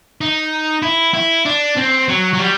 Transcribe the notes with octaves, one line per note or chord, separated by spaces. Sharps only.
D#4
E4
E4
D4
C4
F#3
F#3
G3